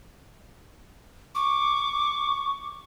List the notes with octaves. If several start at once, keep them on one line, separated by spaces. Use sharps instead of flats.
C#6 D6